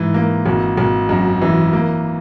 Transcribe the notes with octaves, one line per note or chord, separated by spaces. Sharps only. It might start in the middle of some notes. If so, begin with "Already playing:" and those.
Already playing: G#2 E3
A#3
G#1
G#1
F#2
E3
A#3